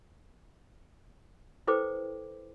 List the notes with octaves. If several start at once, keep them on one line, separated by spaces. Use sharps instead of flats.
E4 A4 B4 C5 G5 D6